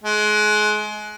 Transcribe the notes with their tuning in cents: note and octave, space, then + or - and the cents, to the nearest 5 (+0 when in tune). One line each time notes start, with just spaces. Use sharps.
G#3 +30